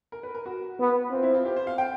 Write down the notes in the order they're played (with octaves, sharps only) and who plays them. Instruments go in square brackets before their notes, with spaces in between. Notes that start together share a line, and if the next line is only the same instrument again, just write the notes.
[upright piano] A#4
B4
A#4
F#4
[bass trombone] B3
[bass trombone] C4 [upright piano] F4
[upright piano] E4
F4
G4
C5
F5
G5